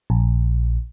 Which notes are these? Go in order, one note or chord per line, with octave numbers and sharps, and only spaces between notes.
A#1